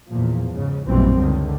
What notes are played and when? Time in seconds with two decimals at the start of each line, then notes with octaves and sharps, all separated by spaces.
0.10 E2 A#2 F3
0.51 G#2 C#3
0.88 A#1 F#2 B2 E3 G3 C4
1.18 C#2 D3 D#3